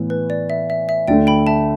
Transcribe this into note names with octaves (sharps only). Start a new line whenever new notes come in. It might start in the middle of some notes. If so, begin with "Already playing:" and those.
Already playing: A2 E3 B3
B4
D5
E5
E5
E5
D2 D3 A3 D5 G5
G5 B5
E5 A5